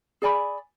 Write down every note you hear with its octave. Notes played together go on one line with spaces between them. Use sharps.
G#4 D5 G#5 B5